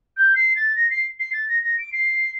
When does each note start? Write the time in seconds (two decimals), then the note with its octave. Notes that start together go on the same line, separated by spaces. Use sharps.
0.17 G6
0.35 C7
0.56 A6
0.75 A#6
0.90 C7
1.19 C7
1.33 A6
1.48 A#6
1.63 A#6
1.78 D7
1.92 C7